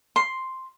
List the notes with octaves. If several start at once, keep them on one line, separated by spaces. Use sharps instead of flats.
C6